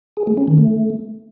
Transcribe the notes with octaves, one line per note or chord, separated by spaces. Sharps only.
G#4
A3
C#4
D#3
A3